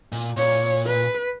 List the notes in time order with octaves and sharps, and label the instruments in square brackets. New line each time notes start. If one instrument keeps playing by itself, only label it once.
[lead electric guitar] A#2
[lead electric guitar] A#2 [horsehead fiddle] C#5
[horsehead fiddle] B4